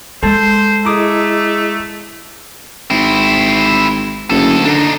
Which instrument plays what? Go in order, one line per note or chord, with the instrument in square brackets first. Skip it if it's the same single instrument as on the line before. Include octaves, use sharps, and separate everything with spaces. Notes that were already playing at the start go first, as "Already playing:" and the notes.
[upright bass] G#3 [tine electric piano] A4 A5 [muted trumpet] C5
[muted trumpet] A3 [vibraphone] E4 G#4 D#5 [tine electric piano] A#5 D6 D#6
[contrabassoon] G#1 [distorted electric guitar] C4 E4
[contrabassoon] F#1 [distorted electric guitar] D2 A4
[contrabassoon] D3 [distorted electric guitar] D4 D#4